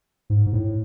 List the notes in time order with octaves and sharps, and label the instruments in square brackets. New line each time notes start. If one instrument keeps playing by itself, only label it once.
[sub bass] G#2
G#2
A2